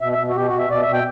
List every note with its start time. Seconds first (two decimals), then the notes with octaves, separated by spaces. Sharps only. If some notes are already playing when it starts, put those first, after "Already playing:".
0.01 B2 E5
0.13 E5
0.18 B2
0.29 F#4
0.36 B2 G4
0.48 F#4
0.53 B2
0.58 E5
0.70 B2 D5
0.82 E5
0.88 B2
0.93 G5